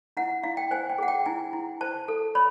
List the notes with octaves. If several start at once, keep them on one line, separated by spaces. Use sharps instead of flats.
E4 F#5
E4 F5
G5
C5 G#5
G5
G#4 F#5
G5
E4 G#5
E4
C5 A5
A4
C#5 B5